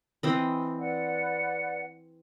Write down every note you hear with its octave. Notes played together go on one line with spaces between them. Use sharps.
E3 C4 D#5
B4 D5 F#5